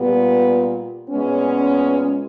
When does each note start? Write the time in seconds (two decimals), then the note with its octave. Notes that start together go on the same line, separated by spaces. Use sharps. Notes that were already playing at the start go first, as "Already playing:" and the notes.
Already playing: A#2 G3 B3
1.10 A#2 G#3 B3 C#4